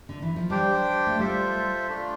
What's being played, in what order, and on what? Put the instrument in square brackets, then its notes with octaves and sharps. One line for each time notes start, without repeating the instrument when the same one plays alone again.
[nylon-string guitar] D3
E3
F3
[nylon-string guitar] G3 [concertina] D4 G4 C5 G5
[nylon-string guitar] A3
[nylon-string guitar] G3 [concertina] F4 A4 C5 E5
[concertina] A3 D4 F4